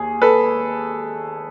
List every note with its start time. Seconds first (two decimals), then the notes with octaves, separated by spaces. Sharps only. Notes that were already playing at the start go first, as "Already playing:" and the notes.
Already playing: D#2 G#4
0.22 A4 B4